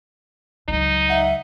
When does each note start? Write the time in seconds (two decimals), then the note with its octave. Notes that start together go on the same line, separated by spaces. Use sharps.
0.68 C#2 F#3 D#4
1.10 E5 F#5